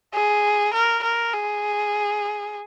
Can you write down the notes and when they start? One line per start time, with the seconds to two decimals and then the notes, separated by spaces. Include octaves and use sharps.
0.14 G#4
0.73 A#4
1.03 A#4
1.33 G#4